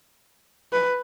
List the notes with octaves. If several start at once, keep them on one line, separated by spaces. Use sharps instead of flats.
B4